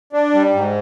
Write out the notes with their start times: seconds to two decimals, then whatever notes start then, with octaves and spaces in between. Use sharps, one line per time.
0.13 D4
0.34 G3
0.53 G#2